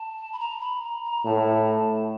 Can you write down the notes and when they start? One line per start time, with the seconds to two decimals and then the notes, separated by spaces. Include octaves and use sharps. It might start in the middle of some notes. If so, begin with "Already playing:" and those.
Already playing: A5
0.32 B5
0.39 A#5
0.60 B5
0.82 A#5
1.03 A#5
1.25 A2 A5